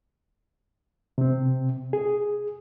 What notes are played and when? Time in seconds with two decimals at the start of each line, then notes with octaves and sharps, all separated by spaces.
1.18 C3 C4
1.93 G#4